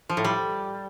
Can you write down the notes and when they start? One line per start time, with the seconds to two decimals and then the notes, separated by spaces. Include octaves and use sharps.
0.09 F3
0.17 A2
0.25 G3